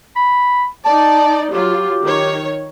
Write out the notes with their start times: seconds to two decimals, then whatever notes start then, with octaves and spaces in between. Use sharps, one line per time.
0.16 B5
0.85 D#4 D5 A5
1.51 F#3 F4 G4
2.04 D#3 C#5